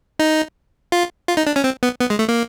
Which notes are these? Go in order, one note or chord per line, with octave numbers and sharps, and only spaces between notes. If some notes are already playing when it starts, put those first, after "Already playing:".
D#4
F4
F4
D#4
D4
C#4
C4
B3
B3
G#3
A3
A#3